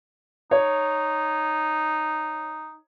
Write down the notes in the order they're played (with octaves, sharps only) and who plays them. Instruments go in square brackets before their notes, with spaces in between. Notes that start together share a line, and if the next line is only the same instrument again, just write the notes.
[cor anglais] D#4 [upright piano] C#5